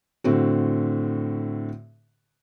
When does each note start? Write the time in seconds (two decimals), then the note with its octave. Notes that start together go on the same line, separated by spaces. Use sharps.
0.24 A2 D3 C4 F#4